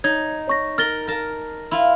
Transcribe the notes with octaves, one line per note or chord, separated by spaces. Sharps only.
D#4 C#5 G#6
C#5 C#6 A#6
A#4 F6 A6 G7
A#4 A5
E4 F4